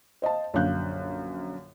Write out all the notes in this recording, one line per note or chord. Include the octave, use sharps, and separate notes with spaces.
C5 D#5 F5 A5
A#1 F#2 D3 F5 F#6 G6